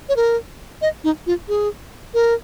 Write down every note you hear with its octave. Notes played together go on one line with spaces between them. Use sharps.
C#5
A#4
D#5
D#4
F4
G#4
A#4